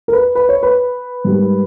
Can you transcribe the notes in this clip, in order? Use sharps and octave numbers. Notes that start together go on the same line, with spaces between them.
A#4
B4
B4
C#5
B4
G#2 G3 A#3